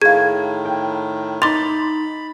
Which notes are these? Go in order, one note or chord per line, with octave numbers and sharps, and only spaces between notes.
A2 D#3 G#4 F5 G#6
G5
D#4 B5 C6 D6 A6